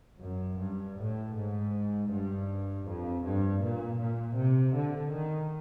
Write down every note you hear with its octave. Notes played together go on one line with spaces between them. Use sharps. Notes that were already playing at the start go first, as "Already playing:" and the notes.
F#2
G2
A2
G#2
G2
F2
G2
A#2
A#2
C3
D3
D#3